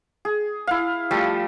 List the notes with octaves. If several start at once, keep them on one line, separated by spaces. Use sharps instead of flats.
G#4
E4 F5
F3 G3 A3